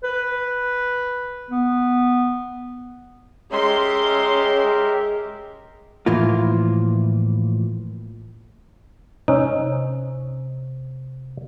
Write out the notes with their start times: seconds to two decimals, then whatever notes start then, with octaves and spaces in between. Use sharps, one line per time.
0.04 B4
1.50 B3
3.52 G#3 C#4 G4 A#4 E5 C6
6.06 A2 E3 F3 A#3 F4
9.28 C3 C#4 D#4